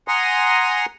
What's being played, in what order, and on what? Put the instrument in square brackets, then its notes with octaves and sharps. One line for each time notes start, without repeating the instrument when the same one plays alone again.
[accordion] F#5 G#5 A#5 C6 D#6